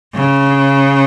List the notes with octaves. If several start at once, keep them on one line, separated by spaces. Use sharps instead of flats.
C#3